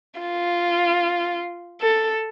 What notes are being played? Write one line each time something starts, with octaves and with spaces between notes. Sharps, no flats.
F4
A4